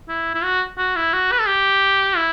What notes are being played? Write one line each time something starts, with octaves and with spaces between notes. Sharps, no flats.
E4
E4
F#4
F#4
E4
F#4
B4
A4
G4
E4